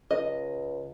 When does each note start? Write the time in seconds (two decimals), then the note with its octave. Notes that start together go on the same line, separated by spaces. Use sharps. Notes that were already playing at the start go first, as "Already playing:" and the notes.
0.11 C#2 D#5